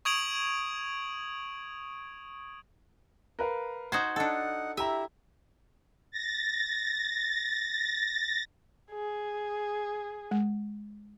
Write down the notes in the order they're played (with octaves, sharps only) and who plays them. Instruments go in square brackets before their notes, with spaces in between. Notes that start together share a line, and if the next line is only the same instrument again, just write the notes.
[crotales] C#6 D#6 G#6 D7 F7 F#7
[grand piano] A#4 B4 F5
[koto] D#4 F#4 C5 [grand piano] G#6
[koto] D4 A4 [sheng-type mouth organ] D#4 F#5
[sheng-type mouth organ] E4 [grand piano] G4 A#5 [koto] E5
[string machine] A6 A#6
[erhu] G#4
[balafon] G#3